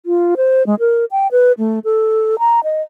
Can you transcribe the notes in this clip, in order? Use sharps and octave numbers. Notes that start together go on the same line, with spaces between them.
F4
C5
G#3
A#4
G5
B4
A3
A4
A#5
D#5